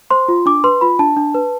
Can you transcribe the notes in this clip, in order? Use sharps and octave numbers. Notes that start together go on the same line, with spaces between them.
C5 C6
F4
D4 D6
B4 C6
F4 B5
D4 A5
D4
B4